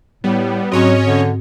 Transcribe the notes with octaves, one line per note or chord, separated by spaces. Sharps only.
A2 G3 B3
G#2 F#3 C4 C#4 F#4 C#5 D#5
D3